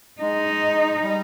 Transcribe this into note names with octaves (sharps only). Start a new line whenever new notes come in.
G#3 D#4
G3